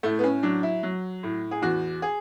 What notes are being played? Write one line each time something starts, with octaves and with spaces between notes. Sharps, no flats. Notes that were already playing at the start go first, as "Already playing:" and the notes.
A2 A3
B3
C#4
F#3 D4
E4
F#3
A2
G#4
E2 F#4
G#4